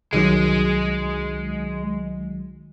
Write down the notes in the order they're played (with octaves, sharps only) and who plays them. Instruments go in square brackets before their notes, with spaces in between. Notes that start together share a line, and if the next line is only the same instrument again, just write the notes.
[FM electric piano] C2 D#3 F#3 [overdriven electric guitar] G#3